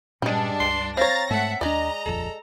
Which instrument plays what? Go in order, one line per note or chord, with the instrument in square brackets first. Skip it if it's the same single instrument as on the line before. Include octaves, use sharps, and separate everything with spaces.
[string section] G2 D4 [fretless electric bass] A#2 C#4 [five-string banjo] G3 G#3
[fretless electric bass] C#2 [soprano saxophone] C6
[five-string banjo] C4 C#5 [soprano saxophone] F5 [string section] A#5 A6 A#6
[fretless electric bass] G#2 G#3 A3 [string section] E5 F#5 [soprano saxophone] A5
[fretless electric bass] D#2 D4 [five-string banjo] G#3 D5 [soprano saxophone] D#5 [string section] A#5
[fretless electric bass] D#1 A#1 F2 [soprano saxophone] A4